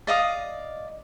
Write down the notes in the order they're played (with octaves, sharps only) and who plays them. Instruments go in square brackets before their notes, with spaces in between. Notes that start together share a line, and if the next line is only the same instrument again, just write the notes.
[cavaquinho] D5 D#5 F5 D#6